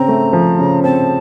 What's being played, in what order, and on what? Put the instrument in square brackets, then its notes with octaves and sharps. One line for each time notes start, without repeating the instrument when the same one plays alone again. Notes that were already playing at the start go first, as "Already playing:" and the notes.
Already playing: [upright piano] C#3 C4 [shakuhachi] A#5
[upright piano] A3
F3
C#3
[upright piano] C4 [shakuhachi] A5